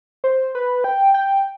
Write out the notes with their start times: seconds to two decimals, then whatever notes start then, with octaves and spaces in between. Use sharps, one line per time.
0.24 C5
0.55 B4
0.84 G5
1.14 G5